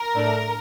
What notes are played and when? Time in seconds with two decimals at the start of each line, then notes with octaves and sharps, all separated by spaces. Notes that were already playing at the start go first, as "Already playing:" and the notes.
Already playing: A#4
0.15 A2 A3 D4